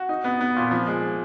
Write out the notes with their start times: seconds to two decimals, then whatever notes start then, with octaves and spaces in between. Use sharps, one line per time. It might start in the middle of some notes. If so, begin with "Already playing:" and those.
Already playing: F#4
0.09 D#4
0.24 B3
0.41 B3
0.56 A#2
0.71 F3
0.87 G#3